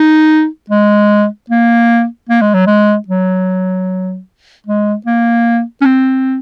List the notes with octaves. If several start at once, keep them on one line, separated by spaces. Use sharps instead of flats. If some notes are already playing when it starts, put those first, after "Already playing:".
Already playing: D#4
G#3
A#3
A#3
G#3
F#3
G#3
F#3
G#3
A#3
C#4
C4